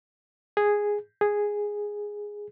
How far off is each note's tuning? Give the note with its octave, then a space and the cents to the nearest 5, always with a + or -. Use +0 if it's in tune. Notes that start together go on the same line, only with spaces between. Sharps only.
G#4 -5
G#4 -5